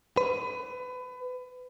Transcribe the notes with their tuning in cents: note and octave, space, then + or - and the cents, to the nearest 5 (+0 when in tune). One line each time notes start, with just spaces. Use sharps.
B4 +25